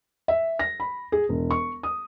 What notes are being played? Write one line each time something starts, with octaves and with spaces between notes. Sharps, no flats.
E5
A#6
B5
G#4
E1
C#6
D#6